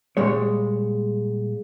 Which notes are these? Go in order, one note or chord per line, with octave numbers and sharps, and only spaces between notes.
A#2 G3 G#3 C#5